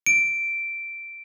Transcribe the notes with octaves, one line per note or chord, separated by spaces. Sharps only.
D7